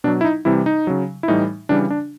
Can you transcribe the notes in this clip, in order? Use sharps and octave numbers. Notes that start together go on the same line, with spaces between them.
B2 F#3 D4
E4
D#4
C3 E3 G3 E4
D#4
C#3 F#3
E4
A2 E3 G3 D#4
C#3 E3 G3 D4
D4